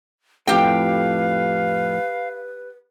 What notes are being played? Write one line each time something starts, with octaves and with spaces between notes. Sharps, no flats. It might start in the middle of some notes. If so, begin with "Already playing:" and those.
F2 A2 G4 B4 F5 G5